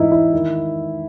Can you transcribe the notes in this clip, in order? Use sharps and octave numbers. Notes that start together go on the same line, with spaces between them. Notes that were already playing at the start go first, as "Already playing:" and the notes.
Already playing: G#2 E3 D#4 E4
E4
D#3